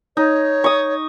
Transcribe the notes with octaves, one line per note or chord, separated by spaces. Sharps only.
D#4 C#5
C#6 D#6